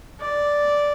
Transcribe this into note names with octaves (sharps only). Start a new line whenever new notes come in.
D5